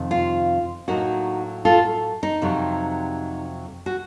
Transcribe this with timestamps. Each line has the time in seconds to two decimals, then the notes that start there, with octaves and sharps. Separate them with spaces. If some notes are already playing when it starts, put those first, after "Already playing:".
Already playing: F2 C3 D#3
0.11 F4
0.88 A2 F#3 A#3 D#4 F#4
1.65 F4 A4
2.23 D#4
2.42 F2 C3 F#3
3.86 F#4